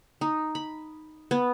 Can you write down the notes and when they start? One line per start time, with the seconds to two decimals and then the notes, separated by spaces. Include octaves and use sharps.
0.21 D#4
0.55 B5
1.31 B3